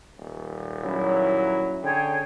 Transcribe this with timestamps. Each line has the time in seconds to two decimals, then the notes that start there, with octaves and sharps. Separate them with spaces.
0.19 D#1
0.82 F#3 C#4 E4 F#4
1.83 D3 G#4 C#5 G5